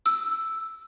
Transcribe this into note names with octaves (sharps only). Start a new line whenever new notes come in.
E6